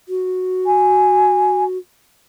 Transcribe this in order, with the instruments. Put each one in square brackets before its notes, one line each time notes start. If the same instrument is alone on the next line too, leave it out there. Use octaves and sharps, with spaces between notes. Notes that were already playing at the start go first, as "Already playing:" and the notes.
[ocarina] F#4
[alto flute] G#5